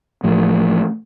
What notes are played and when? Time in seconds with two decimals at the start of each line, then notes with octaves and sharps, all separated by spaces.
0.23 A1 A2 F3